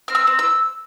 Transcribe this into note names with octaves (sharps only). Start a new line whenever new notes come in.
C4 F6
E6
C4
E6